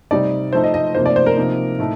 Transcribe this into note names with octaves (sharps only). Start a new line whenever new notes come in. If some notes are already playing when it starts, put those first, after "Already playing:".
C3 G3 C4 D#4 D5
F3 A3 D#4 C5
D#5
D#5
C3 F3 A#3 D#4 C5
D5
C5
A#4
C3 F3 A#3 D#4
A2 A3 D#4